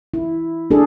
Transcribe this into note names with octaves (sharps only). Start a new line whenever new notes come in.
E4
D4 G#4 A4